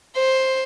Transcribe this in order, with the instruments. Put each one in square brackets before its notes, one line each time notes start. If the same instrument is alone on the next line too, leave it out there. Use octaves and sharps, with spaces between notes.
[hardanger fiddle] C5